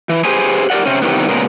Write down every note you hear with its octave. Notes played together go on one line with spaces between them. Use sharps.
E3
G4 G#4 B4 C5 G#5
G4 A#4 C#5 D5 F#5
C3 C4 C#4
C3 D#3 E3 G3 B3
A#2 C#3 G#3 B3 A#4